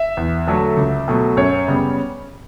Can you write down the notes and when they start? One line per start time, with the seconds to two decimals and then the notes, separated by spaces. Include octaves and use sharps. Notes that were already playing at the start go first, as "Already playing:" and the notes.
Already playing: E5
0.17 E2
0.47 D3 F#3 A3
0.77 C#2
1.08 B2 F#3 A3
1.37 F#2 C#5
1.68 C#3 G3 B3